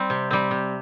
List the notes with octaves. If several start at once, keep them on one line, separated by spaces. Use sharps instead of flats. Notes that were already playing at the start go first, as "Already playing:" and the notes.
Already playing: G3 C4
C3
G3 C4
C3